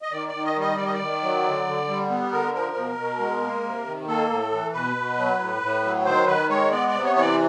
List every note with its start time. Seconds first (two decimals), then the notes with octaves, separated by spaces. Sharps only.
0.02 D#5
0.12 D#3 D5
0.28 D5
0.34 D#3
0.45 D#5
0.56 G3
0.61 D#5
0.77 D#3 D5
0.85 D#5
0.93 D5
1.00 D#3
1.22 F#3
1.44 D3
1.66 D3
1.88 G3
2.10 B3
2.31 D3 A#4
2.54 F3 A#4
2.76 B2
2.97 B2
3.19 G#3
3.42 A#3
3.63 C3
3.86 D#3
4.08 A#3 A4
4.30 A2
4.52 E3
4.73 B2 B4
4.96 B2
5.18 F#3
5.39 A2
5.62 A2
5.84 F#3
6.05 D#3 C5
6.27 D#3 B4
6.49 G#3 C#5
6.71 B3 D5
6.88 D5
6.94 C3
7.04 C#5
7.15 E3 C#5
7.21 D5